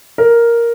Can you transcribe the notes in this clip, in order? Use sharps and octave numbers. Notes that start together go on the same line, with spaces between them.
A#4